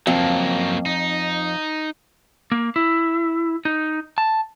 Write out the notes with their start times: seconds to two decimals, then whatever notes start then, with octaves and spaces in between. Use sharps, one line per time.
0.07 F2 F#3 A#3
0.86 D#4
2.52 A#3
2.76 E4
3.65 D#4
4.18 A5